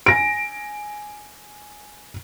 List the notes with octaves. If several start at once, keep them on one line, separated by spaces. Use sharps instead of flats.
G#5 A#6 D7